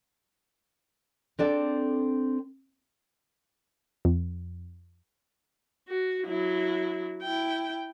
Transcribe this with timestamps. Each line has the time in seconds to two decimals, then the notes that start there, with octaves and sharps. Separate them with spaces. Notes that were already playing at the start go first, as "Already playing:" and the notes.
1.39 C4 D4 A4 D5
4.05 F2
5.88 F#4
6.27 F#3 E4
7.22 E4 G5